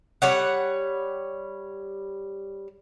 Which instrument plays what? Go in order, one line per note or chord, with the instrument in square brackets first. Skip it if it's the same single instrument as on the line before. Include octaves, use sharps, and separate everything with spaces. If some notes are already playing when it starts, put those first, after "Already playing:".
[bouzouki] G3 C#5 F#5